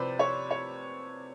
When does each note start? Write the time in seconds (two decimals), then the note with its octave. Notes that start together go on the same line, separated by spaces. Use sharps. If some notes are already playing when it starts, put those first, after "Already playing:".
Already playing: C3 F3 B4 C5 D5
0.19 C#5
0.51 C#5